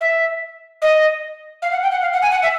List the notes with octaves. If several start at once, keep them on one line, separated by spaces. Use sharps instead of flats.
E5
D#5
F5
F#5
G5
F#5
F5
F#5
G#5
F#5
E5